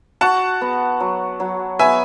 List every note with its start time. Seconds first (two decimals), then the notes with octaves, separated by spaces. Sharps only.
0.21 F#4 F#5 A5
0.61 B3
1.00 F#3
1.40 F#3
1.79 B3 E5 G#5